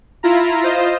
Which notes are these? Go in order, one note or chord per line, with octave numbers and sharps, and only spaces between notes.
E4 F4 A#5
F4 C5 D#5